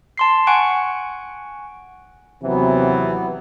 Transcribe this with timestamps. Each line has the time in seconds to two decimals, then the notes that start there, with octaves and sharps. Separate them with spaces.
0.18 A5 C6 C7
0.47 F#5 G#5 C#6 F#6 D7
2.43 D#2 C3 E3 F#3 B3